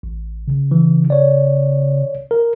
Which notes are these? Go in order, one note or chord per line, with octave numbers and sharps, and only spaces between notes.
A1
C#3
E3
C#5 D5
A#4